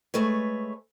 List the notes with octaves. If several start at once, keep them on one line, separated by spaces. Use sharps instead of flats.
G#3 A3 B4 C#5